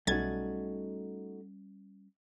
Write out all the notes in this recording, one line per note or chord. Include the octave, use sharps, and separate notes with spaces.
B1 G3 A3 C#4 D#4 F#4 G#6 A6